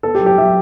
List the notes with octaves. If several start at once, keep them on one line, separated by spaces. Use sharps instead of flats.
B3 A4
G4
F#3
G4
F#3 E5